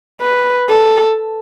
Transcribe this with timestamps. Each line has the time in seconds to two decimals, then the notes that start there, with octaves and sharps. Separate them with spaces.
0.22 B4
0.69 A4